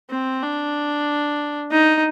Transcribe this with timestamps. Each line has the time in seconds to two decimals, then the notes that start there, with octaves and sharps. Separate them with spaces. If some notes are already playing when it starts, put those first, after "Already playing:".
0.10 C4
0.42 D4
1.71 D#4